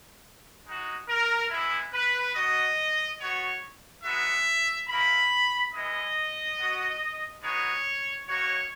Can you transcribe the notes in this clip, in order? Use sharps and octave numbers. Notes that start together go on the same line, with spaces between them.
G#3 D#4 F#4
A#4
G#3 B3 E4
B4
B3 D#4 F#4 D#5
B3 F#4 C#5
G#3 B3 D#4 F#4 E5
A#3 E4 B5
G#3 B3 E4 D#5
B3 F#4
G#3 B3 D#4 F#4 C#5
A#3 D#4 F#4 C#5